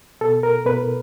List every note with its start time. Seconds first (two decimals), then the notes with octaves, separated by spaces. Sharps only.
0.21 B2 A4
0.43 A#4
0.66 B2 B4